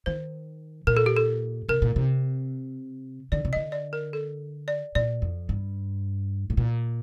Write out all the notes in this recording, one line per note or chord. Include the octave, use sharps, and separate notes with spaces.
D#3 C5
A#2 A#4
A4
G4
A4
C3 A#4
A#2
C3
D3 D5
C3
D3 D#5
D5
A#4
A4
D5
A#2 D5
F2
G2
A2
A#2